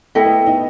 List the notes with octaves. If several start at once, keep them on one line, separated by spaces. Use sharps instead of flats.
A3 E4 A4 D#5 G5
B3
D#4